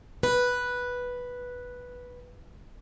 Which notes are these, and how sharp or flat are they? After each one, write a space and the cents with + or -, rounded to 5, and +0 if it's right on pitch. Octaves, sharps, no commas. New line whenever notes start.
B4 -5